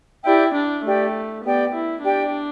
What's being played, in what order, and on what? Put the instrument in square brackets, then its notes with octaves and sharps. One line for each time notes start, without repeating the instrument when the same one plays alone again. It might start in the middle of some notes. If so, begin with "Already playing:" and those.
[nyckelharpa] E4 [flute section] G4 D5 G5
[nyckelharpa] D4
[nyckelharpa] A3 [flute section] G4 D5 G5
[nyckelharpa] B3 [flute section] G4 D5 G5
[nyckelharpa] E4
[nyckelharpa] D4 [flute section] G4 D5 G5